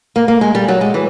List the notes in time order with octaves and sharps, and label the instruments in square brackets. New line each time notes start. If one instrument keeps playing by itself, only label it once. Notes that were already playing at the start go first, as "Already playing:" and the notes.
[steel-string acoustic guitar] A#3
A#3
G#3
G3
F#3
G#3
E3